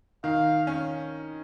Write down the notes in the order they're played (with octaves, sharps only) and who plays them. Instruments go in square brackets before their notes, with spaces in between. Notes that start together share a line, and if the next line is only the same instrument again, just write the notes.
[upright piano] D#3 [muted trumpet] F5
[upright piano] C#4